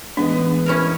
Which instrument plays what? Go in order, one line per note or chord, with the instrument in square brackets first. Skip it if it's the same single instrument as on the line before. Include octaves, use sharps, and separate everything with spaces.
[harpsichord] A1 [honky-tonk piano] G#3 B3 B4 [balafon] D4
[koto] C#4 E4 A#4